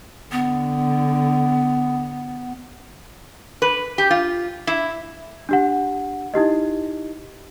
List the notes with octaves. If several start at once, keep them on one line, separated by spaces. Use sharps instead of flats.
D3 B3
B4
G4
F4
E4
D4 G4 F#5
D#4 E4 G4 D#5